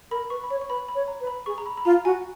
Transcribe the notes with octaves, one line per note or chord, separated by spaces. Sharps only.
A#4 B5
B4 C#6
B5
C#5 C#6
C#6
B4 B5
B5
C#5
A#5
B4
B5
G#4 C#6
A#5
B5
B5
F4 A#5
F#4 G#5